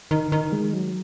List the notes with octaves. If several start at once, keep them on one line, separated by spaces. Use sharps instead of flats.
D#3
D#3
G#3
F#3